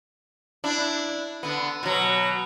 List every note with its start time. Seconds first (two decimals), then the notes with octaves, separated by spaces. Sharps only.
0.64 D4 E4
1.43 D3 B3
1.83 B2 F#3